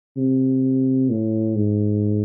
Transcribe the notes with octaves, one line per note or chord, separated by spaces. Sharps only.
C3
A2
G#2